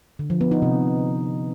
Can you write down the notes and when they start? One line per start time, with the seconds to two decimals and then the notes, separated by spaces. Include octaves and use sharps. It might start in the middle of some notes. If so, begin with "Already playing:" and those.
0.19 D3
0.30 F3
0.41 B3
0.51 D#4
0.62 C3